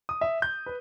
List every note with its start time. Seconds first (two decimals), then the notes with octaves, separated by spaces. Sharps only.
0.09 D#6
0.21 E5
0.42 G6
0.66 B4